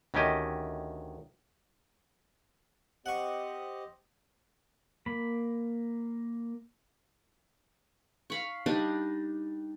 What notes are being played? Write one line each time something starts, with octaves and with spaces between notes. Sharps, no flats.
D2 D#3 C#4 G4 D#5
C4 G4 D#5 F#5 C#6
A#3 B5
F5 B5 C#6
G3 D4 D#4 D#5